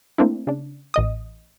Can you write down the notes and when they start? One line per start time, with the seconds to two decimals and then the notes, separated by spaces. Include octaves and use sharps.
0.18 A3 A#3 C4 D4 E4
0.47 C#3 D4
0.94 A1 D#5 D#6